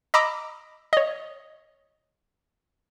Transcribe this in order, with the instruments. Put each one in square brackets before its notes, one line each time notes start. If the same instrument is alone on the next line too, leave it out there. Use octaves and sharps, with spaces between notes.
[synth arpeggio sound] D#5 A#5 B5 D6 E6
C#5 D#5